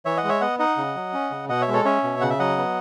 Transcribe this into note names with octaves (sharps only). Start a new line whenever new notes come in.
E3 C#5 E5
D#5 F#5
G#3
C#5 E5
B3 D#5 F#5
D#4 D#5 F#5
C#3
F#3
C#4
C#3
B2 D#5 F#5
C#5 E5
G#3
A4 C#5
C#4 C#5 E5
B2
C#3 F#5
E5
F#3 D#5 F#5
B3